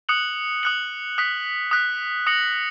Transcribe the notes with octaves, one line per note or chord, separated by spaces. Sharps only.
D#6 F#6 C#7 F#7
D#6 F#6 C#7 F#7
D#6 F#6 B6
D#6 F#6 B6
D#6 A#6 C#7 F#7